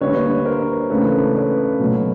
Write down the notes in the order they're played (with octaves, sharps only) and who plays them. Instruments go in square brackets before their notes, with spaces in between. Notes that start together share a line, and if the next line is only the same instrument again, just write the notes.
[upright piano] D2 D3 G3 A#3 D4 [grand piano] B4 C#5
[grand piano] A#4 C5
[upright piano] C#2 C#3 E3 A3 D4 [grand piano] A4 B4
[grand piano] B4 C#5
[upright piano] B2 F#3 A3